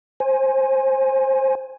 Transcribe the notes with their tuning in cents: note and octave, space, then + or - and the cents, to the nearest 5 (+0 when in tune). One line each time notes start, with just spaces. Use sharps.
C5 +20 G#5 +0